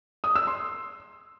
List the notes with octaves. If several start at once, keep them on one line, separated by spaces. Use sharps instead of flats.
D#6
E6
C6